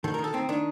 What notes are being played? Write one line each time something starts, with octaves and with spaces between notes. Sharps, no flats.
D#3 A4
A#4
D#3
A4
D#3 C4
D#3 D4